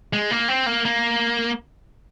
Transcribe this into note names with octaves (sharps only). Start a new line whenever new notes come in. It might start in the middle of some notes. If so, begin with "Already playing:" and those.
G#3
A#3
C4
A#3
A#3